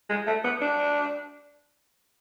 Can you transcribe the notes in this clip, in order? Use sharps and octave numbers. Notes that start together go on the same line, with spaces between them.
G#3
A3
B3
D4